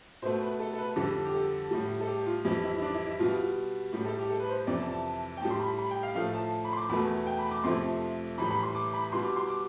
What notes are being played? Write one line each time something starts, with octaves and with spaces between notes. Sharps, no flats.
B2 A3 C5
B4
A4
A4
B4
F2 D3 G3 A4
G4
A4
A2 G3
A4
G4
F4
F2 E3 G3 E4
E4
E4
D4
E4
E4
B2 G3 F4
A2 G3
A4
G4
A4
B4
C5
F2 C3 E3 D5
A5
A5
G5
A2 G3 A5
C6
B5
B5
G5
F5
A2 F3 A3 F5
A5
B5
C6
D6
E2 B2 A3 B5
G5
B5
D6
F2 C3 F3 A3 C6
A2 E3 G3 B5
B5
C6
D6
B5
B2 G3 C6
D6
C6
D6